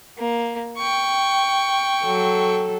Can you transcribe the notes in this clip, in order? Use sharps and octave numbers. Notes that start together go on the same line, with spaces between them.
A#3
G5 C#6
F#3 A4